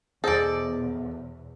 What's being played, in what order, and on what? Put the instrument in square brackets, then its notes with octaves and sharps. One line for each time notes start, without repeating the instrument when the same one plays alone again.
[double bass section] E2 B2 [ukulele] G#4 C5 D#5 [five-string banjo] A4 D5